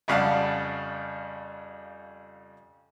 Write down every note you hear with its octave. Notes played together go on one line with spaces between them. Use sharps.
F2 C#3 G3 F5 F#5 A5